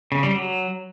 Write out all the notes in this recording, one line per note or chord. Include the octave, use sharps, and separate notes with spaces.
C#3
G3
F#3